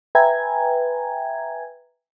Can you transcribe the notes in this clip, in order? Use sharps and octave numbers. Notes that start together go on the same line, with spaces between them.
B4 E5 G5 G#5 A#5 G#6